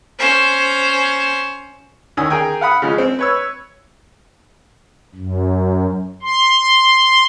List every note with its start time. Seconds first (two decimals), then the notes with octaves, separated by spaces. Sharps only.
0.19 C#4 C5
2.17 D2 D#3 C#4 G#5 D#6 E6
2.30 G#4 A#4 G5 G#5
2.61 F5 F#5 B5 D#6
2.82 C#3 F3 G#3
2.98 C4
3.19 B4 C#5 E6
5.15 F#2
6.22 C6